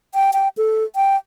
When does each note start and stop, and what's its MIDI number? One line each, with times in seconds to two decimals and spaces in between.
0.15 0.31 79
0.33 0.48 79
0.58 0.84 69
0.96 1.16 79